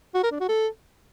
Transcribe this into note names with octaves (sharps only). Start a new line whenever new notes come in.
F#4
A#4
D4
F#4
A4